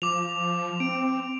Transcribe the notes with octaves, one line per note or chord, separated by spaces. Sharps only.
F3 D6 F7
C4 D7